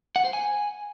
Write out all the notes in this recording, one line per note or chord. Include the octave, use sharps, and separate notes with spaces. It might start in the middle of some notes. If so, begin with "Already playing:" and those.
F#5
C5
G#5